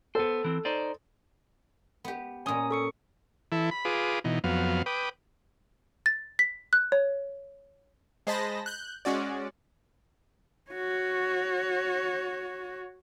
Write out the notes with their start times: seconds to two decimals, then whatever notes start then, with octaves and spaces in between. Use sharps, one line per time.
0.15 B3 A4 C5
0.44 E3 C4
0.65 D#4 C5 D5
2.04 B3 G4
2.46 A#2 C#4 G#5 D#6
2.71 A4 C#6 C#7
3.52 E3 E4 A4
3.71 B5
3.85 F4 G#4 B4 D6 D#6
4.24 B2 E3 D#4
4.44 F2 F#3 B3 F5
4.86 B4 G5 D6 D#6
6.06 A6
6.39 B6
6.73 F#6
6.92 C#5
8.27 G#3 C5 D#5 A5 B5 A#6
8.66 F#6 G6
9.05 G#3 C#4 F#4 D5
10.72 F#4 C#5